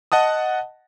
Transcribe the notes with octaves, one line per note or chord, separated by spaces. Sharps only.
D#5 F#5 A5 D#6